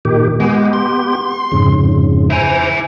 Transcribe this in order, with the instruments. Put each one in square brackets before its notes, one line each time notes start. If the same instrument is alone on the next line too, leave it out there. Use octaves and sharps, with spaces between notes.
[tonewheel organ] A#2 D#3 G4
[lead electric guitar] G#3 [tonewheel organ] B3 G4
[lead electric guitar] C6
[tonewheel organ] F2 G#2 C#3
[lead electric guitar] E4 G#5 [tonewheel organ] C5 A#5